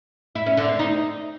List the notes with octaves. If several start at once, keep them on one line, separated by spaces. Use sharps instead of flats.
E4
C#4
D3
C4
D#4